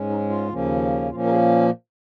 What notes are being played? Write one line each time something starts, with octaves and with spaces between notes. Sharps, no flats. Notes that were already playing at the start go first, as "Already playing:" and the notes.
Already playing: G#2 G#3 C#4
D#4
F4
D#2 C#3 F3 A#3 C#4
A#2 F3 A#3 C#4 F4
A#4
G#4